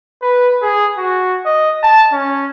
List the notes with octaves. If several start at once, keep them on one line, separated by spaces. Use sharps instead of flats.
B4
G#4
F#4
D#5
A5
C#4